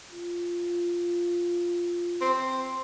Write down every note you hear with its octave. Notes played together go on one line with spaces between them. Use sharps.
F4
C4